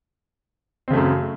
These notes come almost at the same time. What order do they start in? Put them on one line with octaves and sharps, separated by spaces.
C4 C#3 A3 F#2